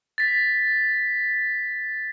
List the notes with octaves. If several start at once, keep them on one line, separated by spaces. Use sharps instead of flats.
A6 B6